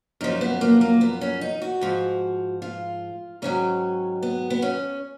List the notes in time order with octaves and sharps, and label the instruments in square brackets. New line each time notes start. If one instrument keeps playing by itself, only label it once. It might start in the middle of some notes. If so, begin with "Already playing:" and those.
[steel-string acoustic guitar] F#2 F3 D#4
B3
A#3
A#3
B3
C#4
D#4
F#4
G#2 F3
F4
G#2 D#3 F#3 C#4
B3
B3
C#4